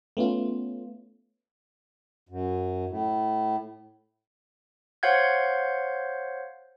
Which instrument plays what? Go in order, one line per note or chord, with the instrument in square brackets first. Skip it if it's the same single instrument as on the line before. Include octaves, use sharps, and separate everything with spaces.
[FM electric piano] A3 B3 C#4 F4
[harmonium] F#2
A2
[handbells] C5 C#5 F5 F#5 G6 G#6